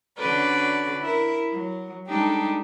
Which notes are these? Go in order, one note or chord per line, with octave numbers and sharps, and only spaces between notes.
D3 C#4 F#4 B4 D5 G6
E4 A#4
F#3
G3 G#3 D4 D#4 G4 A4